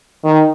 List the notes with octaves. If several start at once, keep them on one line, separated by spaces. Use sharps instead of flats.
D#3